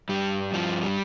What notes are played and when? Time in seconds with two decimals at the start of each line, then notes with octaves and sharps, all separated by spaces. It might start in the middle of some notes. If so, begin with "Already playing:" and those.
0.09 G2 G3
0.53 G2 F3
0.83 G3